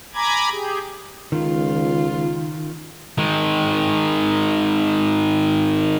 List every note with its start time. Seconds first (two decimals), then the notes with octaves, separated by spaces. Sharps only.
0.14 G#5 A#5 B5 D6 G#6
0.51 G4 G#4
1.32 C#2 D#3 F4
3.18 D#3 G#3